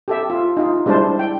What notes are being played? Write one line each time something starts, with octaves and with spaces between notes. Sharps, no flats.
G4 A4 E5
F4
D#4 F4
G3 G#3 D4 E4 C5 A5
G5